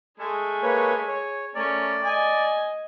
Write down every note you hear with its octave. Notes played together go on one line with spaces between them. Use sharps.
G#3 A3 G#4 G#5
A#3 B4 C#5
C#5
A3 C#4 A#4 D5
D#5 G#5